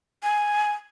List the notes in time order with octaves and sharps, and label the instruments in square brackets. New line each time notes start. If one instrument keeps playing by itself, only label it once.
[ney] G#5